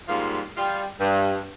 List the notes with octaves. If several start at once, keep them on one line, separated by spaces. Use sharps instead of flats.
G#2 F3 G3 A#3 F4
G3 F4
G2